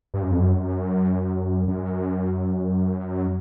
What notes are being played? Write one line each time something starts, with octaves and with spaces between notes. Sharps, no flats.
G2
F#2
F2
F#2
F#2